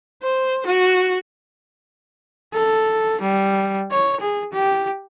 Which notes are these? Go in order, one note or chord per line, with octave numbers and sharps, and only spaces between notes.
C5
F#4
A4
G3
C#5
G#4
G4